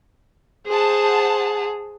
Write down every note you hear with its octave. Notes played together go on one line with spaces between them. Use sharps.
G#4 C5 F#5 A5